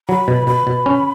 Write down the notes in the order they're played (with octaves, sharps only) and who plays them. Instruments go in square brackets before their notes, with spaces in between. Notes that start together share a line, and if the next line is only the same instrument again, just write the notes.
[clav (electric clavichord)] F#3 [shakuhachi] B5
[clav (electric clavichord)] B2
[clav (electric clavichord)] B2 [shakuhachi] B5
[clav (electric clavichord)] B2
C#4